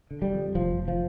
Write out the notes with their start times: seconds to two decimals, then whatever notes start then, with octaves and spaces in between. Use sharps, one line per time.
0.11 D3
0.22 G3
0.33 F2
0.55 F1 F3
0.78 F1
0.88 F3